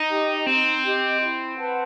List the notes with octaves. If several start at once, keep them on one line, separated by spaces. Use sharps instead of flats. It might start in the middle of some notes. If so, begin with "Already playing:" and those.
Already playing: D#4
G4 D#5 G5
C4 D#4
G4 D#5 G5
E4
B4 F#5 A5